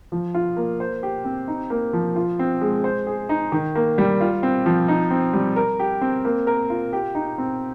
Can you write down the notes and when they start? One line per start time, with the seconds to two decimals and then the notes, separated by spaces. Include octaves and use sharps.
0.12 F3
0.34 F4
0.57 A#3
0.80 C5
1.03 G4
1.25 C4
1.48 D#4
1.70 A#3
1.93 F3
2.16 F4
2.39 C4
2.61 G#3
2.84 C5
3.07 G#4
3.29 D#4
3.52 D#3
3.75 A#3
3.98 G3
4.20 F4
4.43 C4
4.66 F3
4.88 D#4
5.11 C4
5.33 G3
5.56 A#4
5.79 G4
6.01 C4
6.25 A#3
6.47 A#4
6.70 F4
6.93 G4
7.15 D#4
7.38 C4